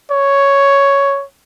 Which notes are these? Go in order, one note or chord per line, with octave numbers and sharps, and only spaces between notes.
C#5